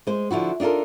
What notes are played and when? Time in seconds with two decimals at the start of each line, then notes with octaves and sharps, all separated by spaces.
0.07 G#3 C5
0.31 D3 F3 E4 F#4
0.60 D4 D#4 F4 A4 A#4